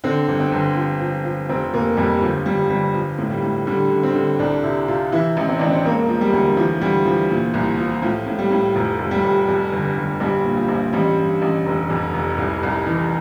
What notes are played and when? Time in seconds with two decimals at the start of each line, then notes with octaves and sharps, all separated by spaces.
0.04 D3 C4
0.28 G1
0.40 C4
0.52 G1
0.76 F3
1.00 F3
1.24 F3
1.49 F1 C4
1.74 F1 A#3
1.97 F2 G3
2.21 G1 F3
2.46 G1 G3
2.70 G1 G3
2.94 F3
3.18 A2
3.31 G3
3.42 A2
3.67 D3 G3
3.91 D3
4.03 C4
4.15 D3
4.39 C2 D4
4.63 C3 E4
4.88 C3 F4
5.12 E3 E4
5.37 A1
5.48 C4
5.59 A1 D4
5.70 C4
5.85 E1 A#3
6.09 F3
6.21 G3
6.33 D2
6.57 E3 F3
6.81 D2 G3
7.06 E3 F3
7.30 A#2
7.54 C2
7.79 F3
8.02 A2 F3
8.27 A2
8.39 G3
8.51 A2
8.75 F1 F3
8.99 F1
9.11 G3
9.24 F1
9.48 F2
9.72 G1
9.96 G1
10.20 A#1 G3
10.45 A#2
10.57 F3
10.69 A#1
10.93 A1 G3
11.17 G2
11.42 A1
11.66 F1
11.90 F2
12.13 F1
12.38 C2
12.63 C2
12.87 E3